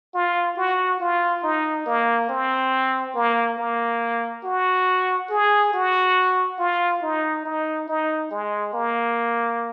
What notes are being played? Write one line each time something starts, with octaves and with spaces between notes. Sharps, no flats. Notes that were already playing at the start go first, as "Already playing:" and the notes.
F4
F#4
F4
D#4
A#3
C4
A#3
A#3
F#4
G#4
F#4
F4
D#4
D#4
D#4
G#3
A#3